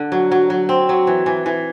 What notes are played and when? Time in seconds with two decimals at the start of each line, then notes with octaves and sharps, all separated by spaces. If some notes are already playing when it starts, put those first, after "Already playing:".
Already playing: D3
0.12 F#3
0.32 F#3
0.50 F#3
0.69 C4
0.89 F#3
1.07 E3
1.26 E3
1.46 E3